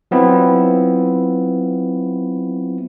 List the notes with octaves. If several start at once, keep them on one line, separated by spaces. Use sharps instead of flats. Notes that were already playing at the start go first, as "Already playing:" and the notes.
F#3 B3 C4 E4 F4